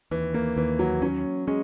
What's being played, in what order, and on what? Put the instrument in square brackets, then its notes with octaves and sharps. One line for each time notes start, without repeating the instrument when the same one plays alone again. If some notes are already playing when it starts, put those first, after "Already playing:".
[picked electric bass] D#2 [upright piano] E3
[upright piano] A#3
[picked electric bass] D#2 [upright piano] E3
[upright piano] F#3
[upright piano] F#3 [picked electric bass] C#4
[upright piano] G#3 [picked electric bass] C#4